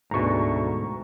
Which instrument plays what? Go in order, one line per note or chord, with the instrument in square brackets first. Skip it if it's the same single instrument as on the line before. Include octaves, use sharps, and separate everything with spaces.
[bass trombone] D2 [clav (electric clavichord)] G#2 B2 [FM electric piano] A#5 C#6